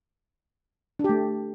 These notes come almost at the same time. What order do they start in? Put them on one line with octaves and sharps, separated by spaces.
D4 G4 A3